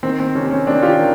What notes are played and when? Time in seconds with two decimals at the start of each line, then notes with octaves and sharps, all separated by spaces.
0.03 D#3 C4
0.20 C4
0.35 C3 C#4
0.46 C4
0.51 C#4
0.67 D#3 C4 D4
0.83 F4 G4
0.99 D#3